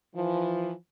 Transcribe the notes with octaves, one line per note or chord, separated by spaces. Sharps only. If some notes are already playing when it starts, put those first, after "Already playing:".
E3 F3